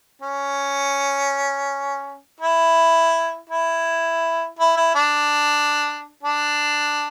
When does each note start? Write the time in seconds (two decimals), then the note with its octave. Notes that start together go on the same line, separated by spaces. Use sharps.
0.21 C#4
2.40 E4
3.49 E4
4.59 E4
4.76 E4
4.95 D4
6.23 D4